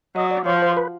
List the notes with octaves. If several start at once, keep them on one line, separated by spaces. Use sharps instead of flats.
F#3 D#5
D5
F3 C#5
C5
B4